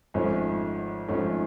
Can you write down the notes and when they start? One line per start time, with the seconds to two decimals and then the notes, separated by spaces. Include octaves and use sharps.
0.14 G#1 G#2 F3 A3 C#4
1.08 G#1 G#2 F3 A3 C#4